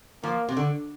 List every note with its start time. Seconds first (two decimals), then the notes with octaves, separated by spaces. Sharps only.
0.23 F3 A#3
0.49 C3
0.57 D3